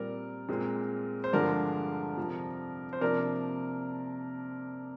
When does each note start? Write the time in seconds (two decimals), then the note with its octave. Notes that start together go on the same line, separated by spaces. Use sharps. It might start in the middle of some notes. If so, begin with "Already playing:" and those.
Already playing: A#2 G3 C4 A#4 D5
0.49 A#2 G#3 C4
1.24 C5
1.33 G2 D3 F3 G#3 A#4 D5
2.17 F2 C3 F3
2.93 C5
3.01 C3 F3 A#3 D4 A#4 D5